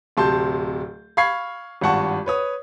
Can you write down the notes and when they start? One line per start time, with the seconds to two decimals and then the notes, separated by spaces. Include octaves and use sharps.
0.17 D1 C3 A5 C6 G6
1.17 F5 B5 C#6 G#6 C7
1.81 G#1 G2 F4 F#5 A5 C#6
2.26 B4 C#5 D#6